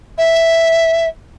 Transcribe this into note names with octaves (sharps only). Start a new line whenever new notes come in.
E5